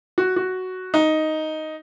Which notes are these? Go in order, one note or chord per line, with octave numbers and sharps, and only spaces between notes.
F#4
F#4
D#4